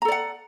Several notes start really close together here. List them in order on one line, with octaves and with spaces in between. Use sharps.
A#5 A4 D5 F#5